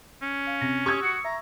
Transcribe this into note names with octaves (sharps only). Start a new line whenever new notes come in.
C#4
F5
C3 A#6
G4 C#6 D#6 E6 G#6
F#4 D#6 C#7
E5 A#5